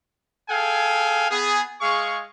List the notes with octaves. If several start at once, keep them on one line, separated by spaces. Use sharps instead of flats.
G#4 A4 F5 G5 G#5
B3 G#4
G#3 G#4 F5 C#6